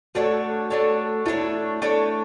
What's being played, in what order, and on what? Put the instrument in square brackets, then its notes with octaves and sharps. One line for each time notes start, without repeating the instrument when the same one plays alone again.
[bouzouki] A3 D4 A4 C#5 [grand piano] F#4
[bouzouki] A3 D4 A4 C#5
[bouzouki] A3 D4 A4 C#5 [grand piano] E4
[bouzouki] A3 D4 A4 C#5